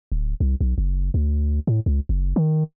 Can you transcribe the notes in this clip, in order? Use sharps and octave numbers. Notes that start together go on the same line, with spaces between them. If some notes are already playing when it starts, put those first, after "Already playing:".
D1
C2
B1
F#1
D2
A2
C#2
F#1
D#3